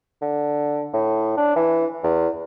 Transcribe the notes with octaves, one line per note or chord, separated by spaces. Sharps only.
D3
A2
D4
E3
E2